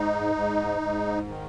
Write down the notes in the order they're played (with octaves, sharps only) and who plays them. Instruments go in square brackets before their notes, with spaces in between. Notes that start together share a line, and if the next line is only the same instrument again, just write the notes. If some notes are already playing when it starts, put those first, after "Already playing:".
Already playing: [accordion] G#2 D#4
G#2
G#2
D#3